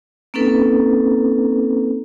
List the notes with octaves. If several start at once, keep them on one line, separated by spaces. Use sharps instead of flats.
A#3 C4 C#4 D#4 A4 B4